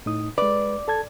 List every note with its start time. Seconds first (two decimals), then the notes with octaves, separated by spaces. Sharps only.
0.06 A2 D#4 D#6
0.38 G#3 B4 D5
0.88 A4 A5 G#6